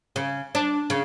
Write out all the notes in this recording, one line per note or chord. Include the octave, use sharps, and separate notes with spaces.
C#3
D4
C#3